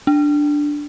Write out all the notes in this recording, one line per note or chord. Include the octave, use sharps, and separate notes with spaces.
D4